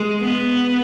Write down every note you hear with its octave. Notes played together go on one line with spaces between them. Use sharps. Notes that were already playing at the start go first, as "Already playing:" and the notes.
Already playing: G#3
B3